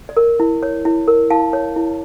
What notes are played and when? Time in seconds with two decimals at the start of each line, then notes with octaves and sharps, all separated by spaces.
0.09 D5
0.17 A#4
0.40 E4
0.63 C#5
0.85 E4
1.08 A#4
1.30 E4 F5 A5
1.53 C#5
1.76 E4